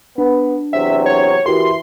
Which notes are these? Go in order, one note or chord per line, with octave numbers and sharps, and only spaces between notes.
B3 D4
E2 C3 F#3 E5
C#5
E3 F#4 G4 A#4 C6